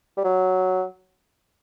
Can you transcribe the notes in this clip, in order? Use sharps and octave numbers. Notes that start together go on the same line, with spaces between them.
G3
F#3